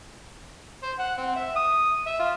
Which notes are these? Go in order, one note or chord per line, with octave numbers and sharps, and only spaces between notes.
C5
F#5
C4
E5
D#6
E5
F4